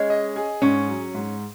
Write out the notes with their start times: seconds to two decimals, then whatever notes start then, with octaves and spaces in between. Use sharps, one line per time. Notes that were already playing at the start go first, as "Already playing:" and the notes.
Already playing: G#3 C#4
0.10 D#5
0.36 G#4
0.62 G#2 C#4
0.88 F#3
1.14 G#2